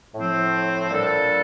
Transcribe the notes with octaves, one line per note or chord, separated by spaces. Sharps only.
A2 F3 C4
A#2 G3 D4 A4